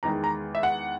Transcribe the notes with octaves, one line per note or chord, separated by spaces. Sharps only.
E2 D#3 G#3 A#5
A#5
E5
F#5